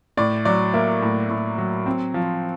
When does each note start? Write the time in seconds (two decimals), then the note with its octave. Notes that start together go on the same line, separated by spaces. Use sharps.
0.17 A2 D5
0.45 F#3 D5
0.74 A#3 E5
1.02 A2
1.30 A2
1.58 F#3
1.86 C4
2.14 F3